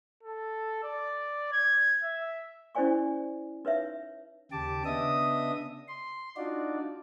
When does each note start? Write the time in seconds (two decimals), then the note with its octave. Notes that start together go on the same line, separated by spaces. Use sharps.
0.23 A4
0.84 D5
1.53 G#6
2.03 E5
2.75 C#4 E4 C5 D5 G#5 C#6
3.65 D#4 B4 C#5 E5
4.52 D#2 C#3 G4 A5 D6
4.85 C#3 B3 D4 D#5 E5 D#6
5.88 C6
6.37 D4 D#4 F4 F#4 D5